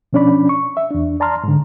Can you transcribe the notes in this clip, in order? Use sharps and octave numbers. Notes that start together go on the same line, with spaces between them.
B2 F3 C#4 D4 D5 B5
C#6
E5
E2 D4
D5 A5 A#5 C6 F6
G#2 D3